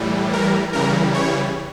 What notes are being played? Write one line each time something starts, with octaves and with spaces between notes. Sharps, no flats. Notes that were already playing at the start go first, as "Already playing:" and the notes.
Already playing: A2 E3 G3
A#4
C#3 E3 G3 A#4
C#5